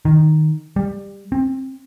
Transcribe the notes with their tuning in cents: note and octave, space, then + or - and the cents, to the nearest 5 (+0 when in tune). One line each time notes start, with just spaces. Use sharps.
D#3 -5
G3 +20
C4 +20